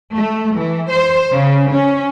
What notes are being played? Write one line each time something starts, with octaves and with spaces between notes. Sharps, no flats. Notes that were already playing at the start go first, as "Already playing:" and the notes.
A3
E3
C5
C#3
C#4